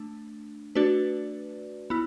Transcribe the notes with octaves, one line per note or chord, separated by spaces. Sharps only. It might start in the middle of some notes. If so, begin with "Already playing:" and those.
Already playing: A3 D4
A3 D4 F#4 B4 D5
B3 E4